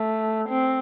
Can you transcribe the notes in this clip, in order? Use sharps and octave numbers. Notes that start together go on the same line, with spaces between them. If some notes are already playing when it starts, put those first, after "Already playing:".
Already playing: A3
C4